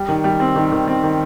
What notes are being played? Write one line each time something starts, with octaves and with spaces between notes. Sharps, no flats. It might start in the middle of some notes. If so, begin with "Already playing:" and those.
Already playing: G3
D#3
G3
C4
D#3
D#3
C4
D#3